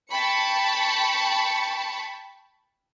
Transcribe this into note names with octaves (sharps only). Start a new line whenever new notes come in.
G5 A5 B5 C#6 C#7